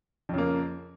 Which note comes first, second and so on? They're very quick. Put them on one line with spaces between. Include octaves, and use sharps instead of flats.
F2 C#3 A#3